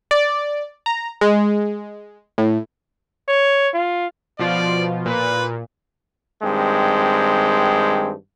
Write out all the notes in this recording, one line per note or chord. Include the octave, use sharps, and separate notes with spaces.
D5
A#5
G#3
A2
C#5
F4
B2 F3 F4 D5
A#2 B4
G2 D#3 G#3 C4